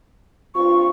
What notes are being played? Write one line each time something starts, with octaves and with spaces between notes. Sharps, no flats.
G2 C4 F4 C#6